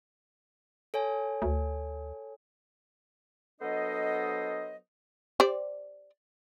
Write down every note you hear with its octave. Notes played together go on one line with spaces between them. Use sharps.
A4 C#5 G#5
D2
F#3 B3 D4 A4 C5 D#5
G4 C5 D5